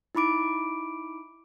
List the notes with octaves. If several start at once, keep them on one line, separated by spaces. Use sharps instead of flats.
D#4 E4 B5 D6 D7